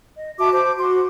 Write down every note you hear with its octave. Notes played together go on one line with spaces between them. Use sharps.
D#5
F#4 E5 A5 D6
C5 D6
F#4 C6